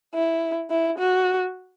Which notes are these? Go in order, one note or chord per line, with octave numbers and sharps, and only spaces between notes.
E4
E4
F#4